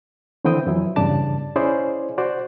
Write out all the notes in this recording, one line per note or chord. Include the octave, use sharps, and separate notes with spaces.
D3 E3 B3 C4 G5 D#6
F2 E3 F#3 E4
E2 G2 C#3 D5 A5 A6
C#4 E4 G#4 C5 D5
F#4 C5 D5